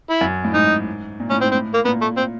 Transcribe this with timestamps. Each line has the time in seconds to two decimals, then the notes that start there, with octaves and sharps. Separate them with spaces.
0.10 E4
0.21 F#2
0.44 A2
0.54 G#2 D#4
1.20 A#2
1.30 A2 C#4
1.41 G#2 C4
1.52 C4
1.55 A2
1.74 A#3
1.85 A#2 B3
2.02 A3
2.17 C4